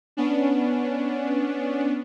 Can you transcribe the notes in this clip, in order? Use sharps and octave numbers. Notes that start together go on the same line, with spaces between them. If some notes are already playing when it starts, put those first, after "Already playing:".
B3 C#4 D4